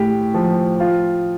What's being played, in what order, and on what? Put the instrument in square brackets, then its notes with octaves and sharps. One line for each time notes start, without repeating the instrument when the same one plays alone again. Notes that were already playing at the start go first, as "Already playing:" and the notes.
Already playing: [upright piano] A2 G4
F3
F4